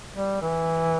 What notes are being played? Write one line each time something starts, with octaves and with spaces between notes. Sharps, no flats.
G3
E3